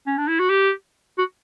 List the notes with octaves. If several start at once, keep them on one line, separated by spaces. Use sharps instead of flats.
C#4
D4
E4
F#4
G4
F#4